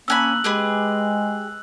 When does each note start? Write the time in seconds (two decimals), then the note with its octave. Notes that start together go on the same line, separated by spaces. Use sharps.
0.08 A#3 C#4 G#5 B5 E6 F#6 F#7
0.44 G#3 G4 G#4 B4